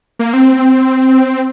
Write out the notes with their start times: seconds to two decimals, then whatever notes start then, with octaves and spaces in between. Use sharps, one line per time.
0.19 A#3
0.33 C4